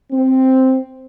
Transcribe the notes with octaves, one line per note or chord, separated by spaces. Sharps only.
C4